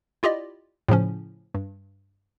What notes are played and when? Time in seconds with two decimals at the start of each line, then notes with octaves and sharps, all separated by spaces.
0.23 E4 F4 G4 D5 D#5
0.88 A2 C#3 F3 C#4
1.54 G2